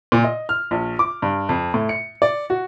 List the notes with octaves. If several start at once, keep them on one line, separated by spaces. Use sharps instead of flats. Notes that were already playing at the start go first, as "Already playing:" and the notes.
A#2
D#5
F6
A#1
D6
G2
F2
A2
C#7
D5
F#4